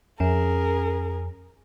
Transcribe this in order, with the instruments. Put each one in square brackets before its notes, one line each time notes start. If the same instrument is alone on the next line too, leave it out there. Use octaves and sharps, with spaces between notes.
[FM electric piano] F2 C#4 [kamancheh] G#4 A#4